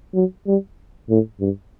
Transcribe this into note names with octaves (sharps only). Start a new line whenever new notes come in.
F#3
G3
A2
G2